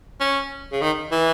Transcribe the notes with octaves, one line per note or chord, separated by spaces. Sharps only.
C#4
C#3
D#3
E3